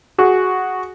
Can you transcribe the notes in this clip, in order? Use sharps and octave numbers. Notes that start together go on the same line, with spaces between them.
F#4 G#4